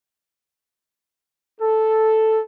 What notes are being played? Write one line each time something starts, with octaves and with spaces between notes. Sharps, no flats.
A4